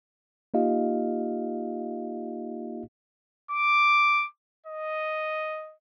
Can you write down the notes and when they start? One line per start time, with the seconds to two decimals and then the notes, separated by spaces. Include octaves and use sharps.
0.54 A#3 D#4 F4 G4 D#5 F5
3.51 D6
4.66 D#5